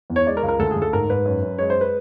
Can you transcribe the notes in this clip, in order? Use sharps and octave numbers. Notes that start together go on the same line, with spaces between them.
E2
C#5
G#3 D5
A#4
C#2
A#4
D2 A4
G#4
D2
A4
G#2 A#4
G#2 B4
F#2
F#2
G#3 C#5
C5
B4